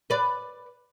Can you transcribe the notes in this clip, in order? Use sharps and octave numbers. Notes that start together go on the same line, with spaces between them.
B4 D5